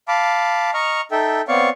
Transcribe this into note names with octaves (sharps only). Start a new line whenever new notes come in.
F5 A5 B5 D6
D#5 A#5 C#6 F6
D#4 A4 E5 G5
B3 C4 C#5 D5 F5 C#6